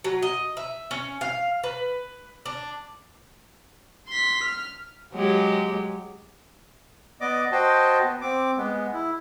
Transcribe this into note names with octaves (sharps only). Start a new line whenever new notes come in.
F#3
D#5
E5
C#4
F5
B4
D4
C6 B6
F6
F#3 G#3 G4
B3 D5 D#5 D6
F#4 C5 D#5 G5 A5
B3
C4 D6
G#3 B3
E4